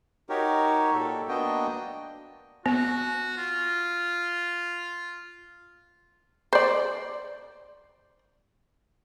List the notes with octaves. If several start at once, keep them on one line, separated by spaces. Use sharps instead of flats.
D#4 F#4 G4 A#4 C#5
A#2 A4
A#3 B3 D4 F#4 D#5 G5
B3 F#4
F4
C5 D5